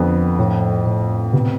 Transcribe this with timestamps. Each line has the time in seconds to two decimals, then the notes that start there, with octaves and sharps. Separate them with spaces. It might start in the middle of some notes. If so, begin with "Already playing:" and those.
Already playing: F2 D3 B3
0.39 A2
0.86 A2
1.33 C3 B3